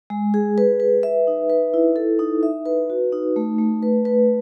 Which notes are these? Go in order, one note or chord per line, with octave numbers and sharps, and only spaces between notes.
G#3
G#4
B4
B4
E5
D#4
B4
E4
A4
D#4
E5
B4
F#4
D#4
A3
A3
B4
B4